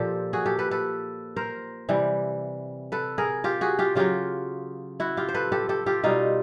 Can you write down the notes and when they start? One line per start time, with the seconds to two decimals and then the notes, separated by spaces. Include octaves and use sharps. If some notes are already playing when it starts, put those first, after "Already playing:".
Already playing: A#2 F3 G4 A4
0.33 F#4 G#4
0.46 G4 A4
0.59 A4 B4
0.71 A4 B4
1.36 A#4 C5
1.89 C3 E3 G3
2.92 A4 B4
3.18 G#4 A#4
3.44 F4 G4
3.61 F#4 G#4
3.79 F4 G4
3.95 C#3 F#3 F4 G4
5.00 E4 F#4
5.17 F4 G4
5.29 C5
5.34 A4 B4
5.52 G4 A4
5.69 G4 A4
5.86 F4 G4
6.04 B2 G3 D#4 F4